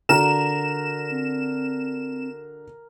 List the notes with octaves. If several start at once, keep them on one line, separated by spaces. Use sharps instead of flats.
D3 F#4 A#4 E7
C4